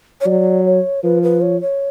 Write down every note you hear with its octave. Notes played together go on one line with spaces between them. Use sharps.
C#5
F#3 D5
C#5
F3 B4
B4
C#5
C#5